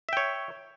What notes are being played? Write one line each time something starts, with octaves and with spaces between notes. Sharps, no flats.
C#5 E5 G5